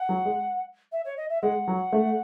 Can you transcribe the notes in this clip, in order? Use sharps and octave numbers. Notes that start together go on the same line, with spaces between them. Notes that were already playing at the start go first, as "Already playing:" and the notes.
Already playing: F#5
F#3
G#3
E5
C#5
D#5
E5
G#3 F#5
F#3
A3